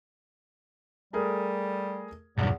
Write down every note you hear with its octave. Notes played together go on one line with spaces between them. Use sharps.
G3 A3 G#4 A#4
B1 E2 G2